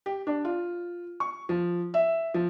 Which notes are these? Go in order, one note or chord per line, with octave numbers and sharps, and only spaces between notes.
G4
D4
F4
C#6
F3
E5
F3